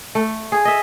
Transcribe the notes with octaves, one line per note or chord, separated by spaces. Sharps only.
A3
G#4
D#5 E5